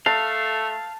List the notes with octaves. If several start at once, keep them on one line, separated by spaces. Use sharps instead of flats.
A3 F5 A5